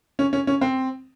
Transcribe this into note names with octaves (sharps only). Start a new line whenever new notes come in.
C#4
C#4
C#4
C4